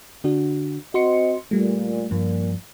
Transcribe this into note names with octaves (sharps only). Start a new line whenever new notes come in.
D3 D4 F#4
C4 F#4 D#5 C6 C#7
A#2 G3 A3
G2 A#2 F3 A#3